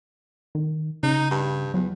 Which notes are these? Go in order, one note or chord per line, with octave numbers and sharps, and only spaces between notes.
D#3
C#3 D#4
G2
E2 F#3